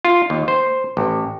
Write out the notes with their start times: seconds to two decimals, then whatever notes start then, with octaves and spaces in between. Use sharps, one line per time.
0.05 F4
0.30 D#2
0.48 C5
0.97 A1